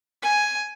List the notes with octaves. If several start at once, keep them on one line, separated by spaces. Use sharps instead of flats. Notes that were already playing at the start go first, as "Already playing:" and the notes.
G#5